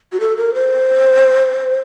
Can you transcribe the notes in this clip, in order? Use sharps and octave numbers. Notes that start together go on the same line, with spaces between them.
F#4
A4
A#4
C5